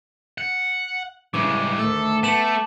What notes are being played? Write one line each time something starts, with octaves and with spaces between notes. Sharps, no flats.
F#5
G2 C#3 E3 G#3 D6
D2 D#3 A3 A4
A3 B3 A5 E7 F#7